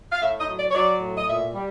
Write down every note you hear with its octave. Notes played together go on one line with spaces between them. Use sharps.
F5
A2 E5
D#5
F#3
D5
C#5
F#3 D5
A2
D#5
A#2 E5
G3